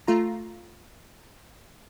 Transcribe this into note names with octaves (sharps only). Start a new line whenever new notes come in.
A3 F4 A#5